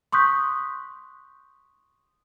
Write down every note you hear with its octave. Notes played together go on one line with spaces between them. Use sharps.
C6 C#6 D#6 F#6 G6 B6